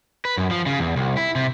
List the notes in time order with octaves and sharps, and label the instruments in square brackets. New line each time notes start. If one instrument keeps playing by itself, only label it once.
[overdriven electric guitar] B4
F#2
F3
C#3
E2
C2
E4
C3